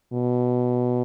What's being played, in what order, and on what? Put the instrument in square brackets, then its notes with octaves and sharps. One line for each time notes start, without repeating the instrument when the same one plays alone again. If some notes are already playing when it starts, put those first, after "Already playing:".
[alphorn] B2